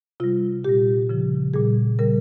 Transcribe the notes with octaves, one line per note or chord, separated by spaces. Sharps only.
C3 G3 F4
A#2 G3 G4
C#3 F3
A#2 G3 G#4
C#3 G3 A#4